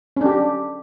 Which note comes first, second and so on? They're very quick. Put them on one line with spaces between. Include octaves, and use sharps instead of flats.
C#4 D4 G4